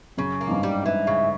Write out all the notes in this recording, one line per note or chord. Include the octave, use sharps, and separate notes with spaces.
F#2 C#3
A#3
G#2
G2
G3
G#2 E3
C#3